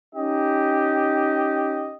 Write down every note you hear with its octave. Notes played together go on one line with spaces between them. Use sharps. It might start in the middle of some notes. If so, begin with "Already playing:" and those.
C#4 D#4 G4 D#5